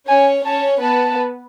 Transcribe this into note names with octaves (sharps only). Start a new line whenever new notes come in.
C#4 C#5 G#5
C#4 C#5 A5
B3 B4 A5